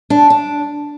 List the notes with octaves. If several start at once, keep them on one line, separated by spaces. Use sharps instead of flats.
D4
D4